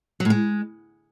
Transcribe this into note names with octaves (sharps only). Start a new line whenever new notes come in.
F#3
A2
G#3